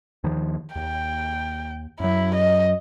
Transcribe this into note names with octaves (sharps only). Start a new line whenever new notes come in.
D#2 D#3 F3
D#2 G5
F#2 F#3 E4
D#5